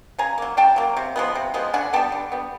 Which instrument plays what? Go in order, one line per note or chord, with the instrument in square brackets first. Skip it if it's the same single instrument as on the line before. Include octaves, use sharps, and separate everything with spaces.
[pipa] C#3 G#5 A#5
F#3 A#3
C#3 G5 A5
F#3 A#3
C3
F3 G#3 B3
C3
F3 G#3 B3
D3 F#5 G#5
G3 B3 G5 A5
D3
G3 B3